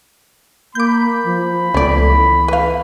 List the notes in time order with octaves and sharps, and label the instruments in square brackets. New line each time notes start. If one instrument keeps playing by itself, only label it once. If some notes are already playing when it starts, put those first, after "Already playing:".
[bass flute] A#3 [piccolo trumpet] B5 [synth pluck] D6 G6
[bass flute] F3
[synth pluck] C#2 [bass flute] A3 [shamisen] B3 D5
[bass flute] E3
[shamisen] B4 F5